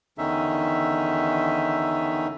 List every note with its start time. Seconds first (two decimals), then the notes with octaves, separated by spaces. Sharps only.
0.18 E2 D3 D#3 C#4 D#4 E5